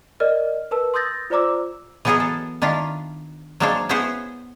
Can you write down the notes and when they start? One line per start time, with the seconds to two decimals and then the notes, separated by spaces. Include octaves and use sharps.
0.20 A#4 D5 D#5 F6
0.71 A#4 B4 A5 E6
0.94 C6 D#6 E6 G6 A6 A#6
1.30 F4 C5 D5 A#5 D6 E6
2.05 E3 F#3 B3 G#4 A#4 D#5
2.20 A4
2.62 D#3 D4 E4 F4
3.60 F#3 G#3 A#3 D4 C5 C#5
3.89 B3 E4 G#4 C5 C#5 F#5